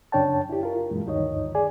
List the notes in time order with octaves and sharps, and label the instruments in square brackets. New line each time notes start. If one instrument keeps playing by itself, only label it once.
[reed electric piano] F#2 C#3 D4 C#5 G5 A5
E4 G4
F4 A#4
F#2 A#2 E3 G#3
D2 G2 D#3 D#4 C#5 D#5
G#4 D5 G#5